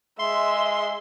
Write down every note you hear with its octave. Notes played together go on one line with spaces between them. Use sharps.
G#3 E5 C6